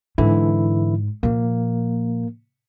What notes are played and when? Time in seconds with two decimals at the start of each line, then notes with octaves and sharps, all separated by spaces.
0.18 G#2 D3 E3 E4
1.23 A#2 F3 A#3